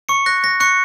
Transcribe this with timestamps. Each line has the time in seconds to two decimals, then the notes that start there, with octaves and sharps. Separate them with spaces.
0.09 C#6 C#7
0.26 F#6 A#6
0.44 A#6
0.60 C#6 F#6 C#7